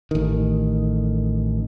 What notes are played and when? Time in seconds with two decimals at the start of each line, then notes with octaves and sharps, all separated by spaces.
0.11 A1 D#3